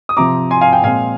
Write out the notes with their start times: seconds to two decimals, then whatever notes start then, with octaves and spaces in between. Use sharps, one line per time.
0.09 D#6
0.17 C3 F3 C4 A#5 D6
0.51 G#5 C6
0.61 F5 G#5
0.73 G5
0.84 A#2 G#3 C4 F5 G#5